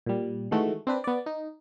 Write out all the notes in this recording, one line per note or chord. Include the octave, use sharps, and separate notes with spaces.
A#2 G3
D#3 E3 G#3 A3 F#4
C4 D4 B4
B3 D5
D#4